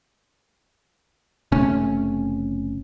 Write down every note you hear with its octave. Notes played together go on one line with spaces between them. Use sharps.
F#1 C3 A3 C#4